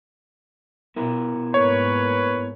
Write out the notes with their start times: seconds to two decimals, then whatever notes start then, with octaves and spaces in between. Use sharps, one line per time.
0.96 B2 B3 E4 A#4
1.54 G#2 A#3 B4 C#5